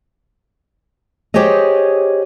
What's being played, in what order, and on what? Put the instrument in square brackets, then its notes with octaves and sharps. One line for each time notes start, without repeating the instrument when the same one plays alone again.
[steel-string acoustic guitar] G4 G#4 C5 C#5 D#5